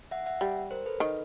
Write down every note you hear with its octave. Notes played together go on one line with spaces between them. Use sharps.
E5 F#5
E5 F#5
G3
A#4 C5
A4 B4
D#3